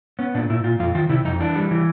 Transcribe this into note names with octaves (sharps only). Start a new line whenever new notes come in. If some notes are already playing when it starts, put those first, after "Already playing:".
B3 C#4
A#2 D4
A#2 E4
A#2 F4
F2 F4
D#3 F4
C3 E4
F2 D#4
E3 D4
G3
E3